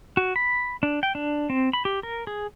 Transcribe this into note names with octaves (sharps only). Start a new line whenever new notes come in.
F#4
B5
D4
G5
D4
C4
B5
G4
A#4
G#4